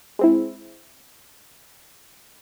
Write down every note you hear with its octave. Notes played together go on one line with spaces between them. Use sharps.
G#3 C4 E4